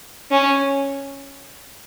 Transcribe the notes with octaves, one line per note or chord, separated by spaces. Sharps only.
C#4